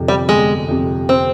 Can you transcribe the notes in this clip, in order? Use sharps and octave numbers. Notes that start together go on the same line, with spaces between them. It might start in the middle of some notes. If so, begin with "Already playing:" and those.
Already playing: G1 F2 C3
G3
G1 G#3
F2 C3
C4